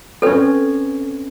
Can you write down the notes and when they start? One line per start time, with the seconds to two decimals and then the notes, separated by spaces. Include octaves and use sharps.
0.22 C4 C#4 A4 B4